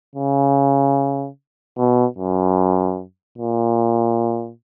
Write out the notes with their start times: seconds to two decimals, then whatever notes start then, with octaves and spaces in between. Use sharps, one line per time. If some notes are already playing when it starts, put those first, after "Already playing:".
0.15 C#3
1.77 B2
2.18 F#2
3.38 A#2